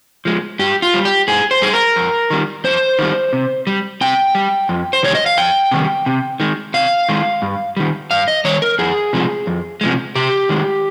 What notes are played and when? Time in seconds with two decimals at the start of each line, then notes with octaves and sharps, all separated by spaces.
0.25 F3 G#3
0.59 G2 G4
0.82 F4
0.94 G3
1.05 G4
1.28 G2 G#4
1.51 C5
1.62 G3 G#4
1.73 A#4
1.96 F2
2.30 D#3 G3
2.64 F2 C5
2.99 D#3 G3
3.33 C3
3.67 G3
4.01 C3 G5
4.35 G3
4.69 F2
4.93 C5
5.03 C3 D#3 G3 C#5
5.15 D#5
5.26 F5
5.37 F2 G5
5.71 C3 D#3 G3
6.06 C3
6.40 D#3 G#3
6.74 C3 F5
7.09 D#3 G#3
7.42 G2
7.77 D#3 G3
8.11 G2 F5
8.28 D#5
8.45 D#3 G3 C#5
8.62 A#4
8.79 F2 G#4
9.13 C3 F3 G#3
9.47 F2
9.81 C3 F3 G#3
10.15 C3 G4
10.49 D#3 G#3